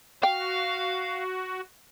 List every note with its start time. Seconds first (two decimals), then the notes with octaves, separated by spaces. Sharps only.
0.23 F#4 F5 G5